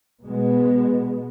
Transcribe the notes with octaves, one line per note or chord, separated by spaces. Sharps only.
B2 G#3 B3